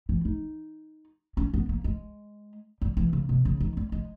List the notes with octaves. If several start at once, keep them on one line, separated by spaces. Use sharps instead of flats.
E3
D#4
C#4
B3
A#3
G#3
G3
E3
C#3
B2
C#3
D#3
G3
G#3